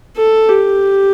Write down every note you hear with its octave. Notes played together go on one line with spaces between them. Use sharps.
A4
G4